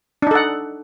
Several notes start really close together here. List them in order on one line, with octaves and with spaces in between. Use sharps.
D4 D#4 A4 F#5